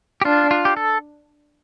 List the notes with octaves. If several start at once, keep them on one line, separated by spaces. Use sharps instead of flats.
G4
D4 F4
F4
G4
A4